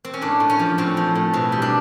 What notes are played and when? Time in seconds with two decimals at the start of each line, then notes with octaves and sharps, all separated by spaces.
0.05 C4
0.14 C#4
0.22 A2 D4
0.40 A2
0.50 C#4
0.59 F3
0.78 A2 C4
0.97 F3
1.15 A2
1.33 B2 C4
1.52 G3
1.62 D4